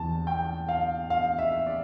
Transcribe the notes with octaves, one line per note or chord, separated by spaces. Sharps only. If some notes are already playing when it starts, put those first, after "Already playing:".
Already playing: E2 E3 A5
G5
F5
F5
E5
D5